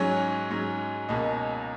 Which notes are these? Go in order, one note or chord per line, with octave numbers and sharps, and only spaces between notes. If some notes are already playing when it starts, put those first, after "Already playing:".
Already playing: G#2 F#3 C#4 C#5
G#2 F#3 C#4
C#2 B2 A#3 C#4 D#5